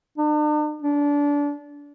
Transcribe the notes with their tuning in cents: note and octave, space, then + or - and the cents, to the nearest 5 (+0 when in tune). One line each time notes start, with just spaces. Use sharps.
D4 +45
D4 -25